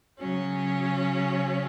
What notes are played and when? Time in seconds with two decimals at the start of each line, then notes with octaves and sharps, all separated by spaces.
0.18 C#3 F#3 C#4